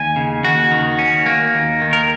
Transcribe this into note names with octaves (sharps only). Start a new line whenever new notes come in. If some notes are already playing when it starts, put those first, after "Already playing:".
Already playing: D#2 G#5
C#3
D#2 F#4
D#3
C#4
A#3
D#2
D#3
A#4